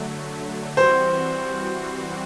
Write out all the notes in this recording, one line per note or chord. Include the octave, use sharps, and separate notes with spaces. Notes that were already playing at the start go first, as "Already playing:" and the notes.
Already playing: D3 F#3 A3
E3 G3 C4 F#4 C5